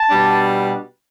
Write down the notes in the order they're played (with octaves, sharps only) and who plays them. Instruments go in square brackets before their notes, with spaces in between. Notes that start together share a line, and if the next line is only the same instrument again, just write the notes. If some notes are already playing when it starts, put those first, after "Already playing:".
Already playing: [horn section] A5
B2 G3 D4